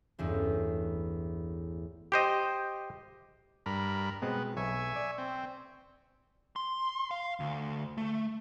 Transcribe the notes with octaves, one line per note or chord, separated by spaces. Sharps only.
A1 E2 G2
G4 C5 D#5
G2 A#4 B5
B2 G#3 B3 C4
B1 E5 G#5 C#6
D5
C4
C6
F5
D2
A3